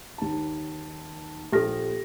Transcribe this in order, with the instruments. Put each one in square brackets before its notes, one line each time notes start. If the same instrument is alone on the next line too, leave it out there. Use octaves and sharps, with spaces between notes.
[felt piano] D#2 A5
[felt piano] A#1 F6 A#6 [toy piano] G4 A4